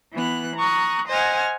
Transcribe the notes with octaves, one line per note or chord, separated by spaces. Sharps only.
E3 B3 F#6
A#5 C#6 D#6 F#6
C5 D#5 F#5 G#5 F6